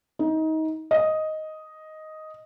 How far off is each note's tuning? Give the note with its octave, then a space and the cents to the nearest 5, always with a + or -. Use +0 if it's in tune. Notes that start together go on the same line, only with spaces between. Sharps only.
D#4 +25
D#5 +5